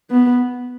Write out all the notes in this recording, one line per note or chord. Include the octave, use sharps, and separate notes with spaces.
B3